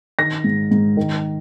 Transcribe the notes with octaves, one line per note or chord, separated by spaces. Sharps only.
D#3 A#6
G#2
G#2
D#3